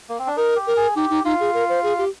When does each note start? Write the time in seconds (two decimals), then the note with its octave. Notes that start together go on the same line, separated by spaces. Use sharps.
0.09 A#3
0.19 C4
0.27 D4
0.37 D#4 A#4
0.56 G4
0.67 A#4
0.77 G#4
0.96 D#4 G4
1.10 D#4
1.24 D#4 F4
1.40 G#4
1.54 A#4
1.69 C5
1.83 G#4
1.98 G4